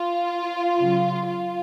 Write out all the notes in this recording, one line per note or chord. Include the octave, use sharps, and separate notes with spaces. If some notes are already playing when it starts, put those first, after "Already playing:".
Already playing: F4
C#3 F#3
F4